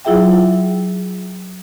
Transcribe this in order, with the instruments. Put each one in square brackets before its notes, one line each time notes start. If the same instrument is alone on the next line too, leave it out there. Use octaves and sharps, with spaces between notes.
[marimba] F#3 E4 F4 G#4 E5 G5